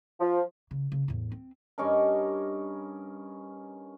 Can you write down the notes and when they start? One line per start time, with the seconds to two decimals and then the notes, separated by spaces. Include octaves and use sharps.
0.20 F3
0.71 C#3
0.92 C#3
1.08 E2 A2
1.32 C4
1.78 G2 C#4 D#4 A#4